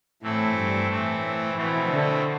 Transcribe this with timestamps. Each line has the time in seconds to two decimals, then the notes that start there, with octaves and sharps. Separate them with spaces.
0.22 A2 E3 A3 C4 E4 A4
0.56 G2
0.89 A2 E3 A3 C4
1.56 B2 E3 A3 C4
1.89 D3